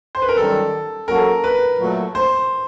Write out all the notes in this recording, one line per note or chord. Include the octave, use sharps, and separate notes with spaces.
C5
B4
A#4
F#2 D#3 G3 A4
F#3 A#3 C#4 F#4 A4 A#4
B4
A#2 F#3 A3
C5